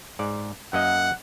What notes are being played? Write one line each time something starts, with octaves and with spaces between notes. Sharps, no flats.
G#2 D5
F#2 A#3 D#5 F#5